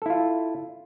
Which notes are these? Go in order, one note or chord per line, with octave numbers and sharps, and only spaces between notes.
E4 F4 A4